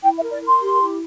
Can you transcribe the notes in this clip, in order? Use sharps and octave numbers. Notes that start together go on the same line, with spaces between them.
E4 G5
E5
A#4
D5
A#4
C6
G4
E4